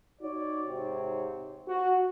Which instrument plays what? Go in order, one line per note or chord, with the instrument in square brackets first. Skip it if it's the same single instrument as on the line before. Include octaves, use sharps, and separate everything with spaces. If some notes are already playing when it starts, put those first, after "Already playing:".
[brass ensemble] D#4 F#4 C#5 D5
G#2 C3 C4 C#5
F#4